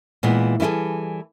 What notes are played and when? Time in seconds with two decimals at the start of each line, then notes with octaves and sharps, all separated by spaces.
0.23 A#2 E3 G#3 B3
0.60 E3 G3 E4 G#4 A4